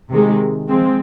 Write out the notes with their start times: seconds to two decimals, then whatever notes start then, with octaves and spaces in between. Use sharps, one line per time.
0.09 C3 D#3 G#3
0.68 F3 G#3 C4